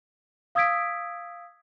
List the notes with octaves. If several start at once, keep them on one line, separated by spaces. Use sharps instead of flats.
F5 D#6 E6 G#6 B6 D7